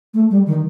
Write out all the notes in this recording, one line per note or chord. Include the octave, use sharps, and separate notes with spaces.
A3
G3
D#3